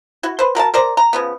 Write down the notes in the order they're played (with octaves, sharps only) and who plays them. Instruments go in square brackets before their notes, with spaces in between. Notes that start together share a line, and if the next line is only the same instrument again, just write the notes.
[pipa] E4 F#4
B4 C5
F#4 A#4 F5 A5
A#4 C5 D5 A#5
A#5
C#3 F3 B3